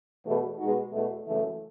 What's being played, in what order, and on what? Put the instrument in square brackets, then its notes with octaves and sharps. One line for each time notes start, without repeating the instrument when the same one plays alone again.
[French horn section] E2 B2 A3
B2 G#3 D#4 F#4
E2 B2 A3
F#2 C#3 E3 A3